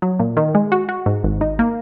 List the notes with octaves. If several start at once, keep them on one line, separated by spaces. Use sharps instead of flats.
F#3
A#2
D#3
G#3
F#4
F#4
G#2
G#1
D#4
A#3